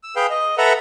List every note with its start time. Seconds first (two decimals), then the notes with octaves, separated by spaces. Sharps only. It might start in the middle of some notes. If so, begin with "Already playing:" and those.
0.03 E6
0.16 G#4 B4 F5 G5
0.30 D#5
0.58 A4 B4 E5 F#5 A#5